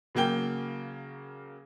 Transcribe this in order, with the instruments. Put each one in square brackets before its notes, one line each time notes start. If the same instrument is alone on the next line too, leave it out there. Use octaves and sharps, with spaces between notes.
[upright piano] C#3 F#3 A#3 G5 G7